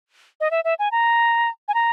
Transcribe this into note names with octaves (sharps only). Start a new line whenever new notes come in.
D#5
E5
E5
G#5
A#5
G#5
A#5